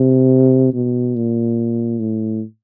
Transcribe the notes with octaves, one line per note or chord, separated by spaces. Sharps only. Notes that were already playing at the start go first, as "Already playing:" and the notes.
Already playing: C3
B2
A#2
A2